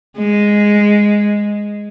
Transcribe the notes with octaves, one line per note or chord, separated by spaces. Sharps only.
G#3